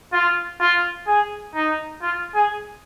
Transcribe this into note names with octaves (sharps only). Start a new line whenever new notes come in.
F4
F4
G#4
D#4
F4
G#4